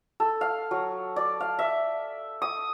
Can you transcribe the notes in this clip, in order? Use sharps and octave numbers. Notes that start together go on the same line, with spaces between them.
A4
F5
F#3
D5
F5
E5
D#6